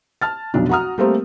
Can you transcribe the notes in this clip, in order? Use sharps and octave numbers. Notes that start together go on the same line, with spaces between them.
A5 F6 A6
F1 B1 B2 F#3 D4
F#4 F#5 A#5 D#6 F6
G3 A3 A#3 C4 G4